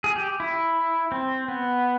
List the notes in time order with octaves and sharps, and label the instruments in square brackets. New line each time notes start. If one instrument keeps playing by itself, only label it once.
[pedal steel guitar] G#4
G4
E4
C4
B3